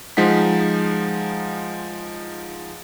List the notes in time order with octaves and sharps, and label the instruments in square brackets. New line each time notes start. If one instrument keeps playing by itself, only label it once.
[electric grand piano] F3 G#3 D#4 F#5 B6